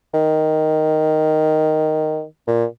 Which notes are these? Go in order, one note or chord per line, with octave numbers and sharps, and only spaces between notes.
D#3
A#2